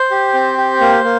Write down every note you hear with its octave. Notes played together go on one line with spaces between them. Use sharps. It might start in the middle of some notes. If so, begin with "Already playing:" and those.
Already playing: C5
G4
C4
G4
A#3
A#3